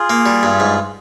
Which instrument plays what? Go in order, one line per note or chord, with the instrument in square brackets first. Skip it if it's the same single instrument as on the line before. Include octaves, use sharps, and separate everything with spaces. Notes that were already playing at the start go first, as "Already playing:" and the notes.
Already playing: [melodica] F4 G#4
[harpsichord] A#3
G3
G2
G#2